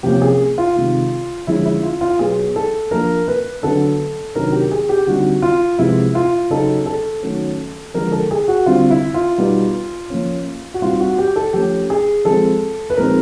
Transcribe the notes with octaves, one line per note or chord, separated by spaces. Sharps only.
C3 F3 A#3 C#4 G4
G#4
F4
C3 D#3 G#3
D3 F3 G#3 C#4 E4
E4
F4
F4
B2 F#3 B3 G#4
A4
F3 A#3 D4 A#4
B4
D3 F#3 B3 D4 A4
C3 D#3 F#3 B3 D4 A#4
G4
G#4
G4
D3 G3 C4 D#4 F#4
F4
C3 F3 G#3 B3 E4
F4
C#3 F#3 B3 D#4 A4
A4
D#3 F#3 A3 C#4
D3 F3 G#3 B3 A#4
A4
G#4
F#4
D3 G3 C4 F4
E4
F4
B2 G3 B3 D#4
F3 A#3 C#4
F#4
A#2 G3 C4 D#4 F4
F#4
G4
A4
F3 A3 C#4 G4
G#4
F3 G#3 C4 A4
B4
A#2 F3 G#3 C4 D#4 A#4